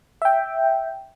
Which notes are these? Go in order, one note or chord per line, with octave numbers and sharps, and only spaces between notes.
E5 G5